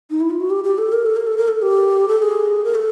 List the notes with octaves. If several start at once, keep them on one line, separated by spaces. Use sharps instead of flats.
D#4
E4
F4
F#4
G4
G4
A4
A#4
A4
A#4
A4
A#4
A4
G4
A4
A4
G#4
A#4
A4